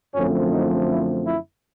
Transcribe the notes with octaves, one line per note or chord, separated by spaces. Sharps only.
F#2 D3 F3 A3 C4 C#4
D#4
E4
E4